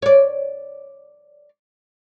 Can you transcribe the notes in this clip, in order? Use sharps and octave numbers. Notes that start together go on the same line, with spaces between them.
C#5 D5